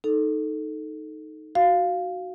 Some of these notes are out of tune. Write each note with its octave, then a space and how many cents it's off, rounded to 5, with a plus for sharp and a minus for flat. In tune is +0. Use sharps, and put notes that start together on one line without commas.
D#4 +0 A4 -5
F#4 +0 F5 +0